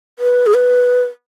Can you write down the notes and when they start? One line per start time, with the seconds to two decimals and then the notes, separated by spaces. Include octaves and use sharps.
0.19 B4
0.47 G#4
0.54 B4